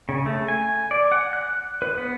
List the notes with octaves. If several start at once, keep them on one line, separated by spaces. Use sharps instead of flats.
C#3
A3
G#5
D5
F#5
F#6
B4
B3